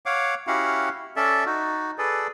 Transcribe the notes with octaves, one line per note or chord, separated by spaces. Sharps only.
C#5 F5 F#5 D6
C#4 E4 F#4 G4 F5 F#5
C#4 A4 D5 E5
D#4 F#4
G#4 A4 B4 D5